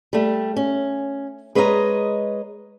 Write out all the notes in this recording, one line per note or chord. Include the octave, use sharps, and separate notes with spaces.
G3 A3
C#4
G#3 B4 C#5 D#5 E5 A#5